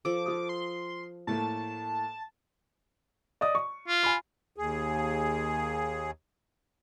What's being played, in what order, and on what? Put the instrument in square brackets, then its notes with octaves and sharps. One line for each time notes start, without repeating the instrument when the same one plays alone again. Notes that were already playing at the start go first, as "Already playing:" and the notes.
[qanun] F3 A4 [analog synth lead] D6
[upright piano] F4 D#6
[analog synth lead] C6
[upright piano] A2 A3 A#3 [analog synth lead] A5
[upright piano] D5 D#5 D#6
C#6
[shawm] F4
[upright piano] G#5 B5
[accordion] D#2 G#4